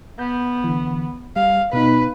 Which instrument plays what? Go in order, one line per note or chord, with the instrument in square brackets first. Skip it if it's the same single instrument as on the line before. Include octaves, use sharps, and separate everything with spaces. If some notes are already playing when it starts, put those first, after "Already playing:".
[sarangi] B3 [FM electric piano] G6
[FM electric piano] D3 E3
[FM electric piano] G3 [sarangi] F5
[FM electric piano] B2 B3 D#4 [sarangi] B4